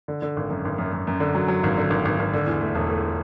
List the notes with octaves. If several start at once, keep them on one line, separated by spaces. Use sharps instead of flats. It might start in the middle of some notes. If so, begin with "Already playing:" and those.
D3
D3
G#1
F#2
G#1
F#2
F#2
F#2
D3
F#3
F#3
G#1
D3
G#1
G#1
G#1
D3
E2
A3
E1
A3